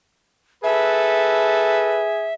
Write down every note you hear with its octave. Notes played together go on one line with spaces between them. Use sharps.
G#4 A4 B4 E5